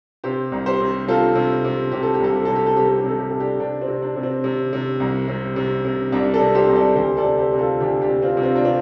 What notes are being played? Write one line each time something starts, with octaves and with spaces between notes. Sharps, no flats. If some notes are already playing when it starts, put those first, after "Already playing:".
C3 G4 C5
C2
G4 C5
C3
C3 F4 A4
C3
C3
C3 G4
A4
G4
C2 A4
G4
C3 A4
G4
A4
C3 G4
A4
G4
C3 A4
G4
C3 A4
D4 G4
C3 D4
C4
C3
D4
C3
C4
C3
C3
C2
C3
C3
C3
C2 D4
A4 D5
C3
G4 C5
C2
A4 D5
D2 G4 C5
A4 D5
C3
G4 C5
C3
F4 A4
D2 D4 G4
D4 G4
C3
C4 F4
C3
C4 F4
D4
C3 C4 F4